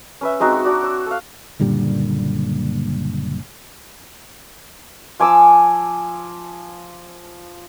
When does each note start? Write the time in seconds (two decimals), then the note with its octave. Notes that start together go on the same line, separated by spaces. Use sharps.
0.21 C#4 B4 E5
0.40 G#3 C4 D#4 F#4
0.52 F#4
0.65 D4 F#4 D5
0.82 C#5 E6
1.06 A4 F5
1.59 F#1 A#2 D3 G3
5.20 F3 G#5 D6 E6